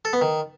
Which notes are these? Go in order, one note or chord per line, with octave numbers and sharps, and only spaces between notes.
A4
B3
D#3